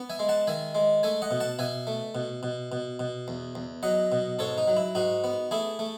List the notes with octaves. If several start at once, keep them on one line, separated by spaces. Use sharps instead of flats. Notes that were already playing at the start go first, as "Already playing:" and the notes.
Already playing: B3
E5 G#5
G#3
F#5 A5
D#3 E5 G#5
G#3
A3 E5 G#5
D#5 F#5
B2
F#5 A5
B2 E5 G#5
A3
B2
B2
B2
B2
E2
E2
F#3 D#5 F#5
B2
G#2 A4 C#5
D#4
F#3
E4
G#2 D#4 F#4
B3
A3 E4 G#4
A3